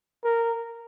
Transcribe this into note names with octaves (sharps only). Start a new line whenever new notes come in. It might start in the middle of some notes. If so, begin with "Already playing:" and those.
A#4